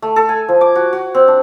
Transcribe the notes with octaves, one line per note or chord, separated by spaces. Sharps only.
A3
A4
G#5
F3
D6
F#4
F#4
C4
D4